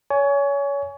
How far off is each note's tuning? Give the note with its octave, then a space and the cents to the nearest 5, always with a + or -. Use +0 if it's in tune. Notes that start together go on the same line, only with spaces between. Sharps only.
C#5 +25 G#5 +5